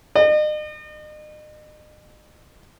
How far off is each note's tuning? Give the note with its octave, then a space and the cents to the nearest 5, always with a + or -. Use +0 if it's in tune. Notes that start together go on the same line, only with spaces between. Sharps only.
D#5 -40